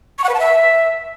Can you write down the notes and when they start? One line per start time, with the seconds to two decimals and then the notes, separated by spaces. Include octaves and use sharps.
0.19 C#6
0.24 F#5
0.29 B4
0.34 A5
0.39 E5